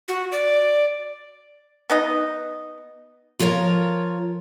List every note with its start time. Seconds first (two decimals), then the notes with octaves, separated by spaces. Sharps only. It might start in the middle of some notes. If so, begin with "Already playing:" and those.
0.08 F#4
0.32 D5
1.90 B3 D#4 D#5
3.39 F3 F4 A#4 C#5 A#5